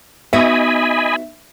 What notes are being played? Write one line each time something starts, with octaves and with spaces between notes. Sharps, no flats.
B3 D#4 F#4 D#5 E5 G#5 B5